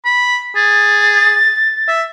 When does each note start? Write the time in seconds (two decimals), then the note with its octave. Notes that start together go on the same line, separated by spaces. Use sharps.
0.05 B5
0.56 G#4 A6
1.88 E5